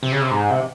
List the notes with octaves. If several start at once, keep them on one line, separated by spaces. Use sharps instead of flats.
C3
C#3
C3
G#2
C3